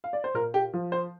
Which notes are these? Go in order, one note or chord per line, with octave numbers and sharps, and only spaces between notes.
F5
D5
C5
A#2 A#4
G4
F3
C5